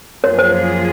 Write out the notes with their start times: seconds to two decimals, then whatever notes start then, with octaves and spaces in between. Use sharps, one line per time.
0.23 F#2 F3 A#3 F4 G#4 C#5
0.39 C5